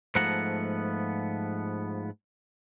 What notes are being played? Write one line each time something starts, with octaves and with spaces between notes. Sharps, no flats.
G#2 F3 A3 B3 F#5 A#5